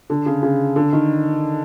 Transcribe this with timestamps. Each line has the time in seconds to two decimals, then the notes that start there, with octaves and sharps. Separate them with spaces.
0.10 D3
0.26 C#3
0.43 C#3
0.76 D3
0.93 D#3